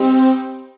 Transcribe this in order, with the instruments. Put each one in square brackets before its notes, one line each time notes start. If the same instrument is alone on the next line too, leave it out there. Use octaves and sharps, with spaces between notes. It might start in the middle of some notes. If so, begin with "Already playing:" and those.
Already playing: [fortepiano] G3 D#4 G4 [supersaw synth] C4